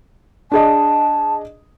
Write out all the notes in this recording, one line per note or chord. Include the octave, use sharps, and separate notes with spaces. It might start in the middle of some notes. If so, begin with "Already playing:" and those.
D4 G#4 D#5 A5